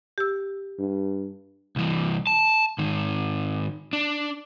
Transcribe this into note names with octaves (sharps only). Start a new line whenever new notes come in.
G4 E6
G2
C2 E3
A5
G#2 D#3
D4